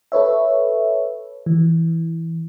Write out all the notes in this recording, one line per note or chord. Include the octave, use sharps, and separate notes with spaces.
A4 B4 C#5 E5
E3